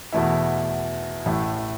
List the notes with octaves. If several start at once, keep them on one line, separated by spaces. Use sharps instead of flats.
E2 B2 A3 E4
A1 A2 A3